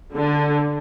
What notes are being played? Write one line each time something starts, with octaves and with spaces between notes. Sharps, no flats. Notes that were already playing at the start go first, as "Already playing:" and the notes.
D3